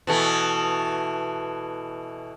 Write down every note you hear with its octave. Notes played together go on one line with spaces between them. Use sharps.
B2 E3 A3